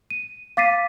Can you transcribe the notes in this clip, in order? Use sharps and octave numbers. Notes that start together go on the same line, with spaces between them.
D#7
F5 D6 A6 B6 C7 D#7